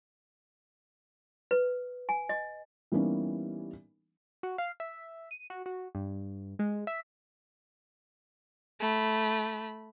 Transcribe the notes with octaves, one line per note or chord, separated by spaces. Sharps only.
B4
G#5
D#5
E3 G3 A#3 B3 C#4 D#4
F#4
F5
E5
D#7
F#4
F#4
G2
G#3
E5
A3 B5